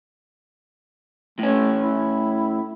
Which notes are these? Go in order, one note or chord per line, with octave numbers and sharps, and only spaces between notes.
A2 A3 C#4
E4